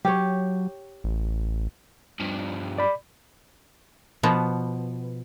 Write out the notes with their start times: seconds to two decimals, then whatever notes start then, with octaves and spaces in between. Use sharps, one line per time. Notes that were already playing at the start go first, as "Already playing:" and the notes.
0.05 F#3 G4 C#5
1.04 A1
2.20 G2 F3
2.78 D5 B5
4.23 B2 F3 B3